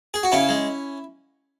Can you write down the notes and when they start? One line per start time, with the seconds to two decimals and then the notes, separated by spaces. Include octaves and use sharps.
0.14 G#4
0.23 F#4
0.32 C#3 C#4 E4
0.49 G#3